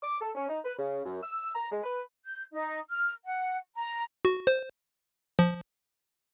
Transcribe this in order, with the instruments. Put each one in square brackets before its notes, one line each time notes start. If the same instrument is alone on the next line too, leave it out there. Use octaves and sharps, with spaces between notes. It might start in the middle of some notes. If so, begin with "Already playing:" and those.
[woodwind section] D6
A4
C#4
D#4
B4
C#3
F#2
E6
A#5
G#3
B4
[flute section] G6
D#4
F6
F#5
A#5
[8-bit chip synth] F#4
C5
F3